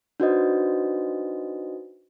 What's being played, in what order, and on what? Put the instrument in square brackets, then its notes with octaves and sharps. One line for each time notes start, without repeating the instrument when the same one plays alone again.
[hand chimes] D4 D#4 F#4 B4 C5 D#5